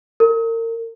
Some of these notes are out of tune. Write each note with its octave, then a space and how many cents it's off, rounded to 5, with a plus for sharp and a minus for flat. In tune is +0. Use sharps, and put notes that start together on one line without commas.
A#4 -35